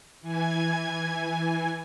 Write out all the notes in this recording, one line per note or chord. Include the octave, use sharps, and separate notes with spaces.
E3 G#5 G#6